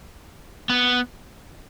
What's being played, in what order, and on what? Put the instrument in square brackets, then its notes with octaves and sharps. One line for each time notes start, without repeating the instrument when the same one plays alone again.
[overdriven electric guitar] B3